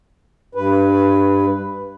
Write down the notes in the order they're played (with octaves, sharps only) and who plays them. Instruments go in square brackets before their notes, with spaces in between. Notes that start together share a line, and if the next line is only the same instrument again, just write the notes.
[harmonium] G2 B4